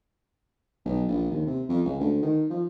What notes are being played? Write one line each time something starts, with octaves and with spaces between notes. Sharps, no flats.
B1
A#1
D#2
C3
F2
C#2
D2
D#3
F3